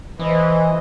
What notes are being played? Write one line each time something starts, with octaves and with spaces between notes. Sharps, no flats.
E3 B4 C5 D#5